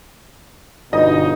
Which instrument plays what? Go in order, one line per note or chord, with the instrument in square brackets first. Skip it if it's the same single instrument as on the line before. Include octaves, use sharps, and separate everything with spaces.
[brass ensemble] G1 B2 D#4 [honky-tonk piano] D#5